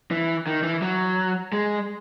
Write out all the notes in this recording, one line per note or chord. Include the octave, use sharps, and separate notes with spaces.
E3
D#3
E3
F#3
G#3